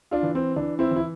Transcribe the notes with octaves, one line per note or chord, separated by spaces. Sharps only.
D4 F4
E3
C4
E3 D4
C4 E4
E3
E4